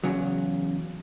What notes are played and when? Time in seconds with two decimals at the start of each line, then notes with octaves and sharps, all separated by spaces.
0.04 E2 C#3 F#3